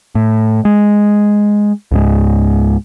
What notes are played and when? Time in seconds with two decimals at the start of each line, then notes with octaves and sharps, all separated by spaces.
0.15 A2
0.65 G#3
1.91 C#2 G#2 G#3